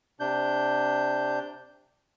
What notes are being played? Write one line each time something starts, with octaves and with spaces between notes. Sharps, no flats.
C3 D4 G6